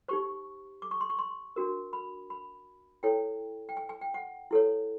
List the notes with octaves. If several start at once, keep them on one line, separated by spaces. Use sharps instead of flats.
D#4 G4 C5 C#6
D6
C#6
C6
C#6
C6
D4 F#4 A#4
B5
B5
E4 A4 C#5 G5
G5
G#5
G#5
G5
F#5
E4 A4 C#5